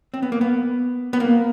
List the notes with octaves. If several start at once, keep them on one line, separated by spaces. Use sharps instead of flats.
C4
B3
A#3
B3
B3
A#3